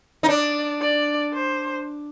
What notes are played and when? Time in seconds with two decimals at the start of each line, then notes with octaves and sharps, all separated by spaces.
0.23 D#4
0.28 D4 D5
0.81 D5
1.34 C5